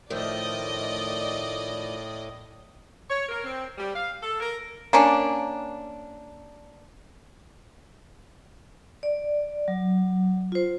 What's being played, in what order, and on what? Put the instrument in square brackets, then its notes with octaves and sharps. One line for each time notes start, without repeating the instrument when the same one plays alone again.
[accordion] A2 [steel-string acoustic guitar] D#3 F3 A3 [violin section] D5 D#5
[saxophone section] C#5
A#4
C4
G3
F5
A4
A#4
[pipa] A#3 C#4 D4
[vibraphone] D5
F#3
F4 C5